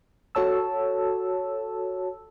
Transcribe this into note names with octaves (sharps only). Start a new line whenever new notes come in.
F#4 A4 C#5 A5 E6